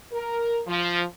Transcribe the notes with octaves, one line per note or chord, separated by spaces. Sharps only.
A#4
F3